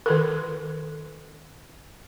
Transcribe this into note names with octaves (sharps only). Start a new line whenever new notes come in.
D#3 A4 A#4